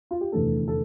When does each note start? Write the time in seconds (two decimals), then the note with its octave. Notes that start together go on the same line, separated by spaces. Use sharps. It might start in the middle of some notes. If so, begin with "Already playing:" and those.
0.11 F4
0.21 G4
0.32 F1 E2 D3 A3 A4
0.68 A4